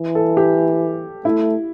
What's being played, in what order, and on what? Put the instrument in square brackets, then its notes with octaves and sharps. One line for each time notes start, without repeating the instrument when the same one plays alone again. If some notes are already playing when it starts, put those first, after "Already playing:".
Already playing: [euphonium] E3
[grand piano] A4
G4
[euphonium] A3 [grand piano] E4